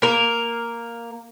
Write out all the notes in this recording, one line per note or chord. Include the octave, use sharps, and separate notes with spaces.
A#3 A#4